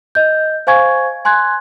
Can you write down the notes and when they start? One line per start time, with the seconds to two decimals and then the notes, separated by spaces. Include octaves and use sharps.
0.15 D#5 G6
0.67 C5 F5 G#5 C#6 G#6
1.25 G#5 C6 F#6 G#6